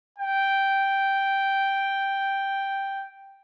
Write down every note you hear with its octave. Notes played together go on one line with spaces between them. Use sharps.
G5